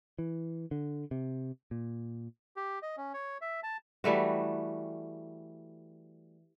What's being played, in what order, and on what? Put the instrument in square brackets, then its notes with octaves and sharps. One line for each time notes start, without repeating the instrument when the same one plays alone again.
[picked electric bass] E3
D3
C3
A#2
[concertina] G4
D#5
C#4
C#5
E5
A5
[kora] E3 G3 A3 F#4